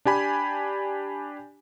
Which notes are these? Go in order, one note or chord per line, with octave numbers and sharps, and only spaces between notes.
D4 G4 G#5 B5